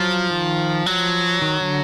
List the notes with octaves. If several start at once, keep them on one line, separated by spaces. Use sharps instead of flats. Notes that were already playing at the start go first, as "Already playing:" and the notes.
Already playing: F3 F#3
D#3
F3 F#3
D#3
D3